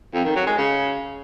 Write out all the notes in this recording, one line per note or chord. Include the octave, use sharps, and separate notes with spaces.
F2
D#3
F#3
G#3
C#3